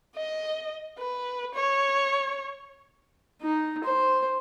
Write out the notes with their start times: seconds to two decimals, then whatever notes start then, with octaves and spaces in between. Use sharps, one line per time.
0.15 D#5
0.98 B4
1.55 C#5
3.42 D#4
3.84 C5